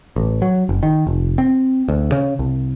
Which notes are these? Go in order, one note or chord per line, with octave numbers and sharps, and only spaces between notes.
A1
F#3
F#1
D#3
F1
C4
D2
C#3
C2